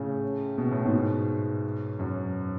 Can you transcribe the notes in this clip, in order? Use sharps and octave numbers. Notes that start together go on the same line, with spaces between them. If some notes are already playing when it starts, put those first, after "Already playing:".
Already playing: A2 C#3
B2
A2
G#2 B2
F#2